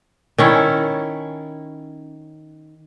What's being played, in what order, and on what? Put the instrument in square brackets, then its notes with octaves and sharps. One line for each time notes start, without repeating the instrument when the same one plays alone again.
[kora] D#3 C#4 E4